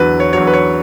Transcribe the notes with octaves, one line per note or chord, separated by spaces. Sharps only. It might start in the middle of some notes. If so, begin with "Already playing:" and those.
Already playing: E2 D3 F#3 B4
C#5
E2 D3 F#3 C#5
B4
C#5